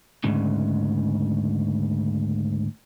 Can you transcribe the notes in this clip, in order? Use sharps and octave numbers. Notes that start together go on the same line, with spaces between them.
D2 G#2 C#3